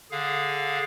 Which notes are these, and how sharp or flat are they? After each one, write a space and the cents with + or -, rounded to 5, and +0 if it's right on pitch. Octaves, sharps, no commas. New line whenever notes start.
D3 +0 G#4 -5 F5 +5